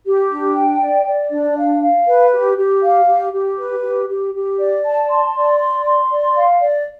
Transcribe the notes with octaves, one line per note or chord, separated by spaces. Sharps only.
G4
D4
G5
D5
D5
D4
F5
F5
B4
G4
G4
F5
G4
G4
B4
G4
G4
G4
D5
A5
C6
D5
C6
C6
D5
F5
D5